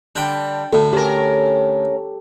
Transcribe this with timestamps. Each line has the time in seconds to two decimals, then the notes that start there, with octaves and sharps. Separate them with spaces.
0.15 D3 G3 D4 G5
0.73 D2 A2 A4
0.93 C#4 G4 A#4